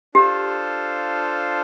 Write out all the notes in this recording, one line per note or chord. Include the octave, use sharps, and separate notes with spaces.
D4 F4 G4 A4 C5 F5